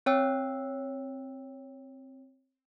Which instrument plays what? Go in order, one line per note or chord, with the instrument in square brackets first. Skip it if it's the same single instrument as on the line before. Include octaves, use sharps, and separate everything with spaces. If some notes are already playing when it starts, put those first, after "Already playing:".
[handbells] C4 C#5 G5 E6